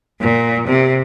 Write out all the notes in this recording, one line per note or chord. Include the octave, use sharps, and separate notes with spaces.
A#2
C3